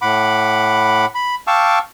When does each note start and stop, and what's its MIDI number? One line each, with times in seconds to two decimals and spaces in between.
0.02 1.06 45
0.02 1.06 78
0.02 1.06 83
0.02 1.06 86
1.15 1.35 83
1.47 1.79 77
1.47 1.79 79
1.47 1.79 81
1.47 1.79 85
1.47 1.79 86
1.47 1.79 88